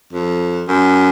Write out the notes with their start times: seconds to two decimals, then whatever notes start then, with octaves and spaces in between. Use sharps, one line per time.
0.13 F2
0.68 F#2